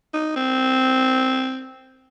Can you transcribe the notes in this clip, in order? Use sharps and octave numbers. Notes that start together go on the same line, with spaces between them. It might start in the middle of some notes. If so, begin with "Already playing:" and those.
D#4
C4